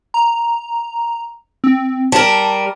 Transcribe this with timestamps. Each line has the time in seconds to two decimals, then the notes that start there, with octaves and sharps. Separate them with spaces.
0.14 A#5
1.64 C4
2.12 G3 A#4 A5